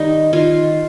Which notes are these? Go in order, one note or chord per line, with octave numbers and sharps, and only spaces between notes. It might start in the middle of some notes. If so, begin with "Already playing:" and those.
Already playing: D#3 G3 D#4
D#3 F4